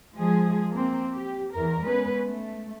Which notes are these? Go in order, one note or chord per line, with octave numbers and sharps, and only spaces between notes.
F3 G#3 G#4
A#3 C4
G4
E2 A#4
G#3 B3 C#4 B4
A3